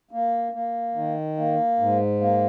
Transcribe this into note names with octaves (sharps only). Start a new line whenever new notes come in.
A#3
A#3
D#3
A#3
G#2
A#3